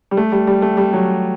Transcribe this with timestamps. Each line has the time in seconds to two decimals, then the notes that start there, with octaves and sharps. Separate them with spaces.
0.11 G3
0.17 A3
0.32 G3
0.47 G3
0.62 A3
0.77 G3
0.93 F#3